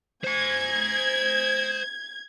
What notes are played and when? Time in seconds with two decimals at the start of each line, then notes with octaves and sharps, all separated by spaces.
0.24 C5 G#5 G#6